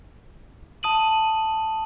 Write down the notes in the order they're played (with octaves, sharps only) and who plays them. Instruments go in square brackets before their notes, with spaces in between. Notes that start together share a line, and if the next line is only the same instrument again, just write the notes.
[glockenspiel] A5 D#6 D#7 F#7